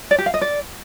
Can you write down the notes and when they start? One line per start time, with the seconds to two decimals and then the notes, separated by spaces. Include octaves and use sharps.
0.11 D5
0.18 G4
0.26 F5
0.34 D#5
0.41 D5